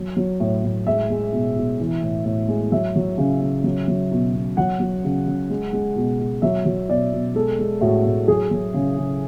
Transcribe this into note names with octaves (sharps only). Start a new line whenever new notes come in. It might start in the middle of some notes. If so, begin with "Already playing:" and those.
Already playing: F#3
F#3
A2
A2
G#3 E5
G#3
B2
B2
E3
A2
A2
G#3
F#3 E5
F#3
C#3
C#3
F#3
F#3
B2
B2
F#3 F#5
F#3
C#3
C#3
G#3
G#3
B2
B2
F#3 E5
F#3
B2 D5
B2
G#3 A4
G#3
A2 F#4
A2
F#3 G#4
F#3
C#3
C#3